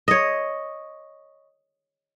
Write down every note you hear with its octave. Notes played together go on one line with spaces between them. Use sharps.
C#5 D#5